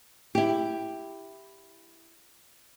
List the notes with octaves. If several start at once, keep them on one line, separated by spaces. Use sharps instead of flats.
E4 G4